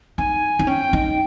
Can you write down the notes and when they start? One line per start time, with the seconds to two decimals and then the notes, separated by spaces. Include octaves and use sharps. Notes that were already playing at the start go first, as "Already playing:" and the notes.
0.18 D#4 G#5
0.59 D#4
0.67 C#4 G5
0.93 D#4